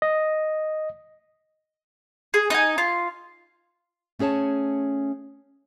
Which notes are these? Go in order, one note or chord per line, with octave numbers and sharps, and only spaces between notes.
D#5
G#4
D#4 G#5
F4
A3 C#4 G#4 C#5 A5